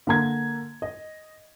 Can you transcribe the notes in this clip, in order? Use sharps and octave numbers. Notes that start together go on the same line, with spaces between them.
D3 A#3 A#5 G#6
D#5